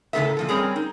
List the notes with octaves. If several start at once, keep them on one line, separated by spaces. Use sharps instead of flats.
A2 C#3 C4 A4 A#4 E5
A#2 F3 A4
G3 C4 C#4 G#4 A#4
D#4